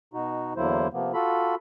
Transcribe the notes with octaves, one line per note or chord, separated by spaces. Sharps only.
B2 D#4 F#4
E2 D3 F#3 A#3 E4 C5
C3 F3 A#3 B3
F4 F#4 A4 B5